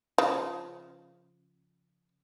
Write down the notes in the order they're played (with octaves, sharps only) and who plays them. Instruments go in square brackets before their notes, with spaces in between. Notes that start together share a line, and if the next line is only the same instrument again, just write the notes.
[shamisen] C#3 F3